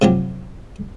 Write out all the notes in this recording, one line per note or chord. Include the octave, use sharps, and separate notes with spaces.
C3 F3 F#3 G4